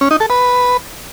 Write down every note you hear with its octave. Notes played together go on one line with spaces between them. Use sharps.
C#4
D#4
A4
B4